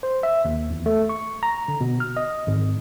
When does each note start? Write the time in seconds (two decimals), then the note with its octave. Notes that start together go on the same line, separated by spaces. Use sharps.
0.03 C5
0.23 E5
0.45 D#2
0.70 E2
0.86 A3
1.09 C#6
1.43 A#5
1.68 D3
1.81 B2
2.00 F6
2.17 D#5
2.47 G#1